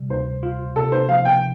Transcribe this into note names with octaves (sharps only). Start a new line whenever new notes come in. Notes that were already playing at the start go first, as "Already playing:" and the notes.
Already playing: C3 G3
D2 C5
F4
C3 A4
C5
F3 F5
G5